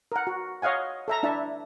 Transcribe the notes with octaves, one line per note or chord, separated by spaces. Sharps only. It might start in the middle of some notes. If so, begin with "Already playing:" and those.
A#4 F#5
F#4
C#5 D#5 F5 F#5 G#5
A4 E5 A#5
D4 E4 E5 A5